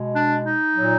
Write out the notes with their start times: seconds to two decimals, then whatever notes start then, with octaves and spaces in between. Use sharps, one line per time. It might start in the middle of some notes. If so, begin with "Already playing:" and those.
Already playing: B2 G#3
0.13 D4
0.44 D#4
0.75 A#2 F#3